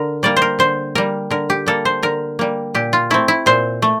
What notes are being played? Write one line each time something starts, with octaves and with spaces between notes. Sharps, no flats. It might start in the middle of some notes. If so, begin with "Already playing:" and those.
Already playing: D3 A#4
G3 A#3 D5
C5
A#4
D3 C5
G3 A#3 A#4
D3 A#4
G4
G3 A#3 A4
C5
D3 A#4
G3 A#3
A#2 G4
F4
A3 C4 E4
E4
A#2 C5
A3